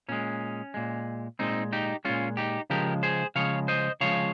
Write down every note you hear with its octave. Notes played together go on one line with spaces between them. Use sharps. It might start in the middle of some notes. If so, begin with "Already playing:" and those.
A#2 G#3 C#4
A#2 G#3
A#2 G#3 C4 D#4
D#4 G4
A#2 G#3 C#4 F4
D#4 G4
C#3 F3 G#3 G4 A#4
G#4 C5
C#3 F3 G#3 C#5 F5
C5 D#5
C#3 F3 G#3 C#5 F5